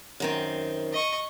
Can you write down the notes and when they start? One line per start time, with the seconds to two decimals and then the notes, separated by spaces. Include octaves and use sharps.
0.20 F#2 D#3 C4
0.92 D#5 C#6